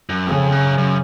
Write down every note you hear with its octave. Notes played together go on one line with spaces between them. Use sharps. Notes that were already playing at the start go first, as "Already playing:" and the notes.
F#2
F2 C#3
F#2
F#2